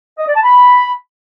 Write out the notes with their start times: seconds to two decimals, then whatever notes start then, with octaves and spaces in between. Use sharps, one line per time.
0.18 D#5
0.27 D5
0.35 A5
0.43 B5